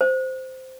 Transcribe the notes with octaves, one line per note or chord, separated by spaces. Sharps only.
C5